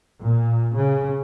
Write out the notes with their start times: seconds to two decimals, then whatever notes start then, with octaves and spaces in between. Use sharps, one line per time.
0.23 A#2
0.75 C#3